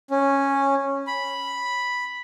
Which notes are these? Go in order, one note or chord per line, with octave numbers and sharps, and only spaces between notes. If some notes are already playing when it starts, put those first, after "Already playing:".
C#4
B5